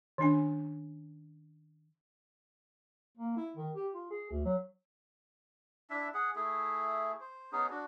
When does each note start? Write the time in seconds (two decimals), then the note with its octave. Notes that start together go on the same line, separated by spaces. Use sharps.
0.18 D#3 C#4 D4 G#5
3.18 A#3
3.37 E4
3.57 D#3
3.76 G4
3.94 F4
4.11 G#4
4.30 D2
4.45 F#3
5.90 D4 E4 E5
6.14 G#4 F#5
6.36 A3 E4 G#4
7.21 C5
7.52 B3 C#4 D#4 G#4
7.70 D4 F#4